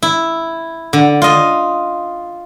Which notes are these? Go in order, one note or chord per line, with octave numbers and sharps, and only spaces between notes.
E4
D3
F4 D#5